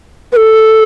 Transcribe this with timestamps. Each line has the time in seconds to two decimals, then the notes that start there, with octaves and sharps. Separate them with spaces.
0.32 B4
0.36 A4